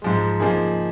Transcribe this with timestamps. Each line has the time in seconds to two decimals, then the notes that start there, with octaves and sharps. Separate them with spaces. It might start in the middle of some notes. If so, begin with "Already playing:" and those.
0.02 G#2 F3 G#3
0.40 C#3 F3 A#3 D#4 G#4